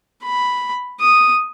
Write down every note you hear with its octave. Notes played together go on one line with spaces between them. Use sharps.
B5
D#6